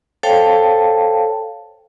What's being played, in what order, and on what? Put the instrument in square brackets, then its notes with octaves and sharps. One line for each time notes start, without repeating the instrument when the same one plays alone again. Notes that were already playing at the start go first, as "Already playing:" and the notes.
[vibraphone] A4 C5 C#5 F5 G5 A5